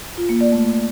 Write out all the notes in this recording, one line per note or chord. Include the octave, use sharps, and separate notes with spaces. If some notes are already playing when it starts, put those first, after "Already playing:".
F4
A#3
D5
A3